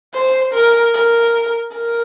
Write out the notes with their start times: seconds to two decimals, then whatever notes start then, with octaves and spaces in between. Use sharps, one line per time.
0.14 C5
0.54 A#4
0.95 A#4
1.73 A#4